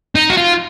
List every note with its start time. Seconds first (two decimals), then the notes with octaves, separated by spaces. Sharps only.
0.15 D#4
0.30 F#4
0.37 F4